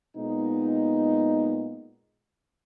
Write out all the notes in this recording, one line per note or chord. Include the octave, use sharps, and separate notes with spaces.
A#2 G#3 B3 D#4